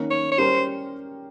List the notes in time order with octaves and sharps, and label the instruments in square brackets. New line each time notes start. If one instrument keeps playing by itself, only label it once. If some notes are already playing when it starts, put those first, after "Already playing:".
Already playing: [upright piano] D#3 A#3 C#4
[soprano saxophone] C#5
C#5
[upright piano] G3 C#4 G4 A#4 [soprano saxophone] C5